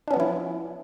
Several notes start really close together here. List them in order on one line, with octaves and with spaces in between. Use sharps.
D4 C#4 B3 F3 E4